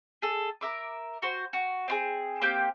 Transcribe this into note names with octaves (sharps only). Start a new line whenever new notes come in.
G#4 A4
A#4 E5 D6
F#4 C5
F#4
C4 F4 G#4
A#3 C4 G4 G6